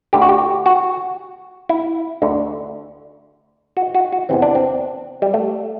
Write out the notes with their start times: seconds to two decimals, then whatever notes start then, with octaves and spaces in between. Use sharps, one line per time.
0.13 D2 D3 G4
0.22 F#4
0.29 G4
0.66 F#4
1.69 E4
2.22 D2 D3
3.77 F#4
3.95 F#4
4.12 F#4
4.29 E2 C3 E3 C4
4.42 D4
4.55 C4
5.22 G3
5.34 A3